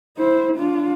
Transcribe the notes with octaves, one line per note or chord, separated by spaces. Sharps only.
E4 C5
D4 F4